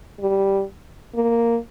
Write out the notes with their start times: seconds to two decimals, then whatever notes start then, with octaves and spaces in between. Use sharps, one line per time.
0.20 G3
1.15 A#3